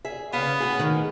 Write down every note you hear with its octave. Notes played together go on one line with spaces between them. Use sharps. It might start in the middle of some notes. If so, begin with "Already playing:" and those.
G#4 E5
C#3 B3 F5
A2 F#4 G#4
D#3